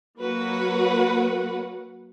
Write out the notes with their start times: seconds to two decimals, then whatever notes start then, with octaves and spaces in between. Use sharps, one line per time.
0.20 F#3 A#3 F#4 A#4 B4 F#5